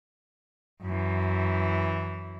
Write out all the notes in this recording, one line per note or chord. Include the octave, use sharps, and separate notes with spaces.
F#2 E3